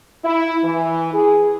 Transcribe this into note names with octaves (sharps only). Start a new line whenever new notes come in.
E4
E3
G#4